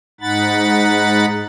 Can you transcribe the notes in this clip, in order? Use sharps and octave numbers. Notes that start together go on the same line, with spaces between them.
G#2 D#4 F#5 B5 A6